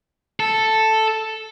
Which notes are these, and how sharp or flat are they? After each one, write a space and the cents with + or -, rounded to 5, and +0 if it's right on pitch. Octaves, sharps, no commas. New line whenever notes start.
A4 +0